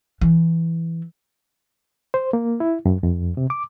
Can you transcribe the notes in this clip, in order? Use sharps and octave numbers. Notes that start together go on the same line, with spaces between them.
E3 E4
C5
A#3
E4
F#2
F2
C3
D6